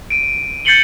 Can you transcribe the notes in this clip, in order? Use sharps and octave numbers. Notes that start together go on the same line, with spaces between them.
D7 D#7
G6 A6 C7 C#7 F#7 G7